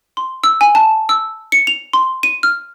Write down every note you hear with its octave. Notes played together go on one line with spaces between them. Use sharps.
C6
E6
G#5
A5
E6
C#7
F7
C6
D#7
F6